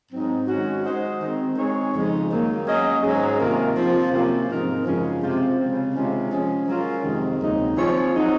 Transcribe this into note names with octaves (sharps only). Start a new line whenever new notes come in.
G#2 F#3 C4 D#4
D#3 G#3 C#4 F#4
G#3 D#4 F#4 C5 D#5
D#3 G#3 C4
G#3 C4 D#4 G#4 C#5
F2 C#3 F3 G#3 D#4
D#3 F#3 A#3
F#3 C#4 G#4 D#5
G#2 F#3 C#4 G#4
C3 D#3 A#3 F4 A#4
F3 C4 F4
C3 F#3 A#3 C#4 F4
G#2 F3 C4 D#4 A#4
F#2 C#3 F3 G#3 C#4
C3 F3 C4 F4 C5
C#3 G#3 C4
C3 D#3 G#3 C#4 F4
F3 G#3 C#4
F#3 C#4 F4 A#4
F2 C3 D#3 G#3
D#2 C#3 F#3 C4 D#4
F3 C4 F4 G#4 C#5
F#3 C4 D#4 F#4